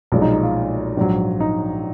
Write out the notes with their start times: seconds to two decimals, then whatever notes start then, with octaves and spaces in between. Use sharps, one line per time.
0.12 B1 A#2 F3 G#3
0.22 D#4
0.33 D#4
0.43 F4
0.97 A#1 G#2 F#3
1.40 D#4